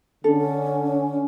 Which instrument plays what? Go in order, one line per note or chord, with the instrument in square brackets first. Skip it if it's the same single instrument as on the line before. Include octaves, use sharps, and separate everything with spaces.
[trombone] D3 [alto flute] C#4 [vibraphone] D4 [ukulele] A4